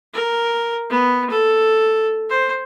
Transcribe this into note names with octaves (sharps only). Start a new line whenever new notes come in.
A#4
B3
A4
C5